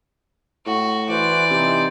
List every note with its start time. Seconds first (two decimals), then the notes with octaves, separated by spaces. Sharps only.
0.66 A2 F#4
1.09 E3 F#4 B4 C5 D5
1.50 C3 D#4 C5